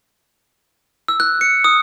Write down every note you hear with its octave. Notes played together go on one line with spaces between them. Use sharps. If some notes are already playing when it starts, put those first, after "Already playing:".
E6
F#6
C#7
D#6